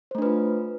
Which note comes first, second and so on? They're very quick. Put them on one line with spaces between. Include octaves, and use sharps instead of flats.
C5 A3 D4 B4 F4